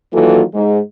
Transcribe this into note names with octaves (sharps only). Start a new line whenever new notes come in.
D#3 E3 F#3 A#3 F4 A4
G#2